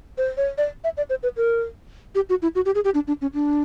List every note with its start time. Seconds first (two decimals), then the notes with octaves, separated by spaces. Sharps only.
0.18 C5
0.37 C#5
0.58 D5
0.84 E5
0.97 D5
1.10 C5
1.23 B4
1.37 A#4
2.15 G4
2.29 F#4
2.42 E4
2.55 F#4
2.66 G4
2.75 G#4
2.85 G4
2.94 D4
3.07 D4
3.21 C#4
3.34 D4